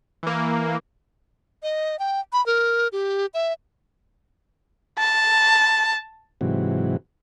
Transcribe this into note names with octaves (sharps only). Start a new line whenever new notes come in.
E3 A#3
D#5
G5
B5
A#4
G4
E5
A5
G#2 C3 E3 F#3